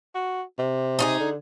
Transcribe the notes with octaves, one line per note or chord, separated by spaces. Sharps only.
F#4
C3
D#4 F4 G#4
D3